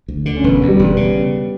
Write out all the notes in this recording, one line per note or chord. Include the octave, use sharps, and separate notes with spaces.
D2
D3
C#4
E1 B3
D2
G3
E1
B3
C#3